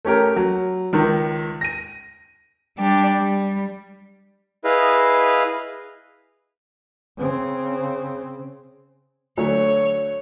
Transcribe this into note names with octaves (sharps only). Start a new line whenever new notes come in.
A3 C#4 G4 A#4
F#3
C#2 D#3
A#6 D#7
G3 D4 G4
G3
E4 G#4 B4 D#5 F5
C#3 C4
D2 F#3 A3 C#5